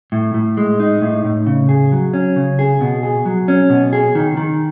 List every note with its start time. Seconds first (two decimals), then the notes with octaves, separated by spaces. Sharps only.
0.12 A2
0.34 A2
0.57 G#3
0.80 D#4
1.02 A2
1.24 A2
1.47 C#3
1.69 G#4
1.92 F#3
2.14 C#4
2.36 C#3
2.59 G#4
2.81 B2
3.03 G#4
3.25 F#3
3.48 C#4
3.70 B2
3.93 G#4
4.15 D#3
4.37 D#3